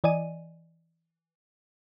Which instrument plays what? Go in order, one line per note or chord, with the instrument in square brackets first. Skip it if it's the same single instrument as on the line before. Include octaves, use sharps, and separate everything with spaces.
[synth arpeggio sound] E3 D5 D#5 G#5 D#7